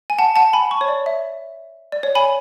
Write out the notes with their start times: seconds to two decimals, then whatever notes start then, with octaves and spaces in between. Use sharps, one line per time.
0.10 G#5
0.19 F#5 A5
0.36 F#5 A5
0.53 G#5 B5
0.71 A5 C#6
0.81 C#5
0.88 D5
1.06 E5
1.92 D5
2.03 C#5
2.15 G#5 B5